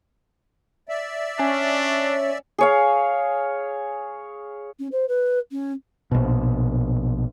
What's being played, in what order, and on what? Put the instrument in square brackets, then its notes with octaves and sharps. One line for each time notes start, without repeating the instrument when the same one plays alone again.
[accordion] D5 E5
[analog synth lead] C#4 [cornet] D4
[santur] G#4 C#5 F5
[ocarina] C#4
C5
B4
C#4
[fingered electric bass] A#1 B2